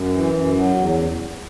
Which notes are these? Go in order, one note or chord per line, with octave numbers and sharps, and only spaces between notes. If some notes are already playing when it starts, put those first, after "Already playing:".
Already playing: F#2
E3
F#2
F#3
E2